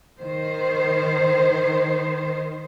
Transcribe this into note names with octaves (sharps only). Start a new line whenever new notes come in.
D#3 C5